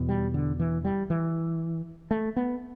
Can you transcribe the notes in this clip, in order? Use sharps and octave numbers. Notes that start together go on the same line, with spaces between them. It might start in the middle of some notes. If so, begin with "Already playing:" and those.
Already playing: E2 B2
G3
D3
E3
G3
E3
A3
B3